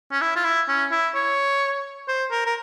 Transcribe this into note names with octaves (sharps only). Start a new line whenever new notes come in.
C#4
E4
F4
E4
C#4
E4
C#5
C5
A#4
A#4